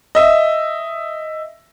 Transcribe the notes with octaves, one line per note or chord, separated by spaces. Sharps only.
D#5 E5